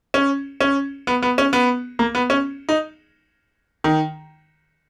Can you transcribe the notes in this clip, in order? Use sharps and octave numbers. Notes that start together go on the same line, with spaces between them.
C#4
C#4
B3
B3
C#4
B3
A#3
B3
C#4
D#4
D#3